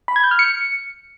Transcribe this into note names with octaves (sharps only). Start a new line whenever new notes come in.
B5
G#6
G6
F6
C#7